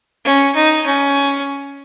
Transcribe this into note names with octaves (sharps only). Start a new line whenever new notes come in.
C#4
D#4
C#4